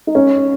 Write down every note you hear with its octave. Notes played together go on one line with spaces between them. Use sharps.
D#4
C#4